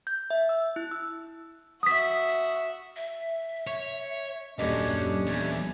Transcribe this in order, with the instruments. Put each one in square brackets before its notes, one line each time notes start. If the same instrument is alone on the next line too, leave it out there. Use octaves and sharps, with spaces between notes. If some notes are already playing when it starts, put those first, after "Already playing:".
[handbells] G6
E5
E6
E4
E6
[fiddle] F#4 E5 [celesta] D#6 B6
[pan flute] E5
[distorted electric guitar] C#5
[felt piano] D#1 D#5 [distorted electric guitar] F#2 [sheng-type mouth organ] C#4 D4 [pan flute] G4
[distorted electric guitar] E2